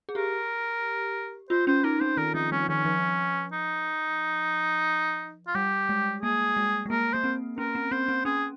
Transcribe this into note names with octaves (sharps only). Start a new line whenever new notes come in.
G#4
G4 A#4
F4 C5
C#4 C5
D#4 A#4
C4 C5
D#3 A#4
F3 D#4
G3 C#4
D#3 C#4
F3
D#4
F4
G3 G4
G#3
A#3 G#4
G#3
G#3
A#3 A#4
A#3 C5
C4
C#4 A#4
C4
C4 C5
C4
C#4 G#4